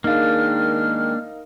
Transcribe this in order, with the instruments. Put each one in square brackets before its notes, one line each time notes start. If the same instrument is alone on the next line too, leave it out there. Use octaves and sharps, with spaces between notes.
[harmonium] D#3 G#3 [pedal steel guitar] A#3 D4 [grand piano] D#4 A#4 F5 [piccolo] F6